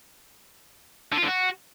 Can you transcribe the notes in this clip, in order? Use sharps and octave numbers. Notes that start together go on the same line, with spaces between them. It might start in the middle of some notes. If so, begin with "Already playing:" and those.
D3
F4
D3
F#4